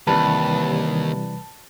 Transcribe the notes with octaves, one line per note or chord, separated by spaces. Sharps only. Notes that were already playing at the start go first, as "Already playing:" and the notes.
D#2 C3 E3 G3 B4 A5